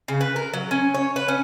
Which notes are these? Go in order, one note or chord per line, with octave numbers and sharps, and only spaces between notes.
C#3
B4
A#4
F#3
C#4
C#5
B4
C#4